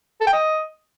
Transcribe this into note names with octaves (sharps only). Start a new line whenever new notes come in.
A4
G5
D#5